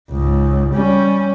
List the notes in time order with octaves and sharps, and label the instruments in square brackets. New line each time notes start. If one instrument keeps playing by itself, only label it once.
[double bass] C#2 G#2
G3 C#4